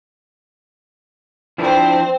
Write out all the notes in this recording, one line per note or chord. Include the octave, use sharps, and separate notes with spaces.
F3 C4 D4 E4 C5